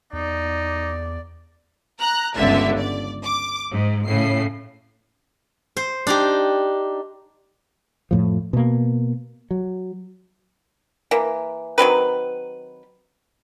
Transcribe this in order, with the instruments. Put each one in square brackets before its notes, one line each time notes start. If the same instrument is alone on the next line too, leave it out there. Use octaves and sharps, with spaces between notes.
[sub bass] E2 [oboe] D#4 [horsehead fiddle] D5
[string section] A#5 F#6
G1 C#2 D3 E5
D5
D6
G#2
A2 C#3 C7
[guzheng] C5
D4 D#4 G4
[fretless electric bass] F2 A2 F3
B2 A#3
F#3
[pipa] E3 A#3
D#3 F#3 C4 B4